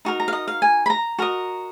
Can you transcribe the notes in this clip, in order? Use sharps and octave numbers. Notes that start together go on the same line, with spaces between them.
D#4 F#4 A#4
A#5
F5
D#5
F5
G#5
B5
A#5
F#4 A#4 D#5